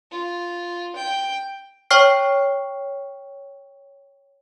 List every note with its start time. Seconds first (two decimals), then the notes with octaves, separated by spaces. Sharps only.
0.12 F4
0.96 G5
1.91 C#5 G5 C#6 F6 C7